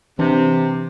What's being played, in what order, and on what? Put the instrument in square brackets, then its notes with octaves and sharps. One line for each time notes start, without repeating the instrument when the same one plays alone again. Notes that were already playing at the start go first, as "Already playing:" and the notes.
[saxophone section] C3 [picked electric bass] E3 D4